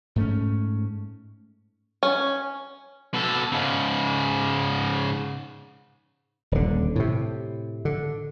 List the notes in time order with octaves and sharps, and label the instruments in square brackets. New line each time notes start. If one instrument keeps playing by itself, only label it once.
[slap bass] G#2 A3 C#4
[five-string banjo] C#4
[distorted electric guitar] B2 A4
G#2 C#3
[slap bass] D#1 D3
A2 C3
D3